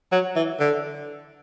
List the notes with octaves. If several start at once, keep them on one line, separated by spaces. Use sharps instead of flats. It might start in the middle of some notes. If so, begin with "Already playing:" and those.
F#3
E3
D3